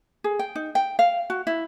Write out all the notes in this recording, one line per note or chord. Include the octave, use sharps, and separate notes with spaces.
G#4
G5
D#4
G5
F5
F#4
E4